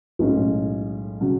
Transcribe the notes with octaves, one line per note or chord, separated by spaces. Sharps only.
B1 A2 G#3 C#4
C#3 F#3